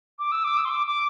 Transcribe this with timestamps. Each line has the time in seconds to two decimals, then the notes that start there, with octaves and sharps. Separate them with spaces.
0.19 D6
0.32 E6
0.44 D6
0.57 E6
0.65 C6
0.70 D6
0.87 D6